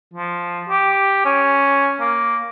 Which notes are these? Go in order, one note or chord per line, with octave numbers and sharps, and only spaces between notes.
F3
G4
C#4
A#3